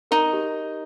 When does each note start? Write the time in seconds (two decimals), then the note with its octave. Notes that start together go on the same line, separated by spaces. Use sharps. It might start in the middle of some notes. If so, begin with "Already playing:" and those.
0.11 D#4 A#4
0.33 G4